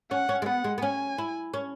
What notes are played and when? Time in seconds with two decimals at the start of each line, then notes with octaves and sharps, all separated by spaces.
0.11 C#4 F#5
0.29 C#4
0.42 G#3
0.46 B3 F#5
0.64 G#3
0.78 B3
0.82 C#4 G#5
1.18 E4
1.54 C#4